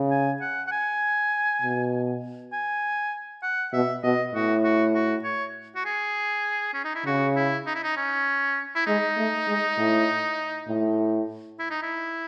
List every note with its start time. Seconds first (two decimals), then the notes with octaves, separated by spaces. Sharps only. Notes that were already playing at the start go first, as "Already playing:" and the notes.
Already playing: C#3
0.11 G#5
0.41 F#5
0.67 F#5
0.71 G#5
1.62 B2
2.53 G#5
3.43 F#5
3.73 B2 E5
4.03 B2 D#5
4.33 A2 F#4
4.64 F#4
4.94 F#4
5.24 C#5
5.76 F#4
5.85 G#4
6.73 C#4
6.84 D#4
6.95 E4
7.05 C#3 F#4
7.36 E4
7.66 D#4
7.75 E4
7.84 D#4
7.96 C#4
8.75 E4
8.86 G#3 D#4
9.17 A3
9.47 G#3
9.78 A2
10.68 A2
11.59 E4
11.70 D#4
11.82 E4